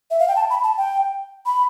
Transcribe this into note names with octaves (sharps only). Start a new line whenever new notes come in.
E5
F5
G5
A5
B5
A5
G5
B5